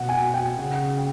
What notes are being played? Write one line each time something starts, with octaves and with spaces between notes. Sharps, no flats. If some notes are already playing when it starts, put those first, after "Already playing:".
Already playing: B2 F#5
G#5
G5
C#3 F#5
G5